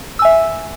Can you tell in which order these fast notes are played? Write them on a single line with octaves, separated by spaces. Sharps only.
E6 G#5 E5